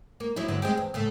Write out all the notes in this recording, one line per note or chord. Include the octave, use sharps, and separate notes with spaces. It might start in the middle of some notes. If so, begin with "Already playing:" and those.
A#3
F3 F#3 E4
G2 D3 F#3
G#3 C4 G4
E2
A2 C#3 A3